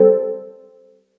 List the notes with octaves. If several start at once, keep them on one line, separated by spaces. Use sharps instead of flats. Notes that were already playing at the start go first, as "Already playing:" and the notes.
Already playing: G3 C4 A4